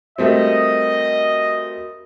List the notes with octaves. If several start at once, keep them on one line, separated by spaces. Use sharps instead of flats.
G3 A3 C4 F#4 A#4 D#5